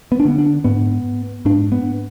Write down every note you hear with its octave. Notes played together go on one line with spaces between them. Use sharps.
B3
D4
D3 B3
D4
G#2 B3
G#2 D4
B3